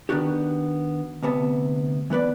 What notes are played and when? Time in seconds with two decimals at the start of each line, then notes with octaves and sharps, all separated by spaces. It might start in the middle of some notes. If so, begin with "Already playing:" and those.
0.09 D#3 E3 B3 D4 F#4 G4
1.23 D2 C3 B3 A5
2.10 E3 B3 B4 D5